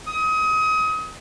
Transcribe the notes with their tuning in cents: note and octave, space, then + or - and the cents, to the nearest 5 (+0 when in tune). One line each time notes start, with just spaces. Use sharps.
D#6 +30